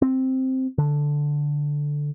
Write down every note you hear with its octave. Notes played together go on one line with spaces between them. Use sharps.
C4
D3